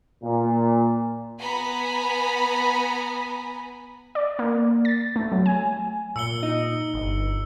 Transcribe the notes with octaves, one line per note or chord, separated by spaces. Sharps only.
A#2
B3 G#5 A#5 B5
D5
A#3
A6
A3
F#3
G#5
A#2 E6 C#7 G7
D#4 D#5
G1